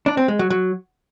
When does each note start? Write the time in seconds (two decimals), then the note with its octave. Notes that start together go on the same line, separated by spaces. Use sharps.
0.06 D4
0.17 C4
0.28 G#3
0.39 F#3
0.50 F#3